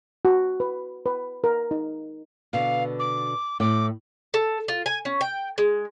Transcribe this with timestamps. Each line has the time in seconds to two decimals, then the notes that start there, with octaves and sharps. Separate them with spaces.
0.25 F#4
0.60 B4
1.06 B4
1.44 A#4
1.71 D#4
2.53 B2 D3 F5
2.99 D6
3.60 A2 G5 D6
4.34 A4
4.68 F4
4.86 G#5
5.05 C#4
5.21 G5
5.58 G#3